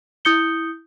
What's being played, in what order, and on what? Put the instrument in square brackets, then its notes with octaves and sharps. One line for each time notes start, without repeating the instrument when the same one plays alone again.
[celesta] E4 D#6 G6 C#7 G7